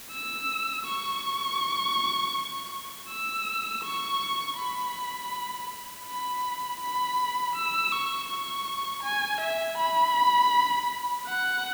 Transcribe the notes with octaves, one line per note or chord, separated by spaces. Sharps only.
E6
C#6
E6
C#6
B5
B5
B5
E6
C#6
C#6
G#5
E5
B5
F#5